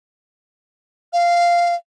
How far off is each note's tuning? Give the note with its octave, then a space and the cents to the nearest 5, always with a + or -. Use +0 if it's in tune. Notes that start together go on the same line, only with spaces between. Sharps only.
F5 -10